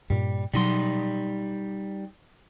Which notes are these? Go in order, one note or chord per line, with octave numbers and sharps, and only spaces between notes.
G2 A#2 G3
B2 F#3 G3 D#4 C6